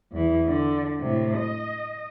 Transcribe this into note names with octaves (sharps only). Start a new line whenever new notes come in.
E2 E3
D3
A2 C3
D#5